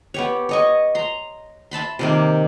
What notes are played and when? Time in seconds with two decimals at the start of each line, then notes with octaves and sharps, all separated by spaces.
0.14 B3 G4 C#5
0.49 C#5 D#5 C#6
0.95 A#5 C6
1.71 E5 A5 B5 C6
1.99 C3 D#3 A#3